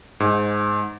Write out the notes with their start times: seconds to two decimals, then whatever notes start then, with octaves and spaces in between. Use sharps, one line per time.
0.20 G#2